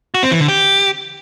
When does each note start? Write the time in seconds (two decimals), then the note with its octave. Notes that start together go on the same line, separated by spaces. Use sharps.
0.14 F#4
0.23 C4
0.31 E3
0.40 D3
0.48 G4